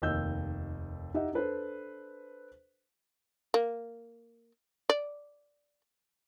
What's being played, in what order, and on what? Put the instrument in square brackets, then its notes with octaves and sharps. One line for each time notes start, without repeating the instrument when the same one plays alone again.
[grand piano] F1 D#2 D#5 E6 G6
D#4 G4 D#5 E5 F#5
D4 A4 B4 C5
[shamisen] A#3
D5